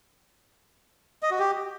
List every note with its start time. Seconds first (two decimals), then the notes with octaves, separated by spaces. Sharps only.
1.23 D#5
1.31 F#4
1.39 G4